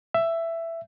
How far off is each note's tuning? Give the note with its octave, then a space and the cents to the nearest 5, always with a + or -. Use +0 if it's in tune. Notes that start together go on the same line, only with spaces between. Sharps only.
E5 +10